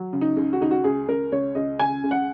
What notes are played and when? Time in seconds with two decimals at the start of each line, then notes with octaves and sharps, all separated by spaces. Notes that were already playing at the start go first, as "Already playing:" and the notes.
Already playing: F#3
0.13 C#3
0.21 D#4
0.37 C#2
0.53 F#4
0.61 C#2 D#4
0.71 F#4
0.84 C#2 G#4
1.08 C#2 A#4
1.32 C#2 C#5
1.55 C#2 D#5
1.79 C#3 G#5
2.04 C#2
2.11 F#5